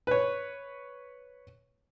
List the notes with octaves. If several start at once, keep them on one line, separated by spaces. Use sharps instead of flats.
B4 C#5